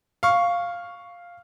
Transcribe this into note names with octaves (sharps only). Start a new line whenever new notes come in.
F5 C#6